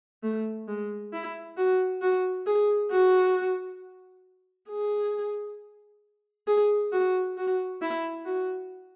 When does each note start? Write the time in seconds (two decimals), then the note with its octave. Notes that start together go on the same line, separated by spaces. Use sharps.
0.23 A3
0.68 G#3
1.13 E4
1.57 F#4
2.01 F#4
2.46 G#4
2.91 F#4
4.70 G#4
6.47 G#4
6.92 F#4
7.37 F#4
7.82 E4
8.25 F#4